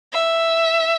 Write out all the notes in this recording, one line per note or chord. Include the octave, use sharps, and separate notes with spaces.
E5